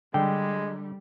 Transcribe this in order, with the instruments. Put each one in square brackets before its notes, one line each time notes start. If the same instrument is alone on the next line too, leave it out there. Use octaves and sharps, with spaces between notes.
[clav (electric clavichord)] D3 [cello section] G3 [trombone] G#3 [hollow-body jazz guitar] G5